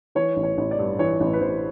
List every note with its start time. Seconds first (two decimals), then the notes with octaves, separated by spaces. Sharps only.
0.15 E3 C#5
0.37 A1
0.43 C#5
0.57 A1
0.71 D5
0.79 G2
0.99 E3 C#5
1.20 A1
1.33 B4
1.41 A1 C5